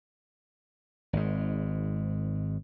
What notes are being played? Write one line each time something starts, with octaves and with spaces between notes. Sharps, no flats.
G#1 G#2